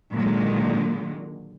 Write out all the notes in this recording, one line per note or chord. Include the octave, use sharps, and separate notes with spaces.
A#2 D3 D#3 F#3 G#3 A#3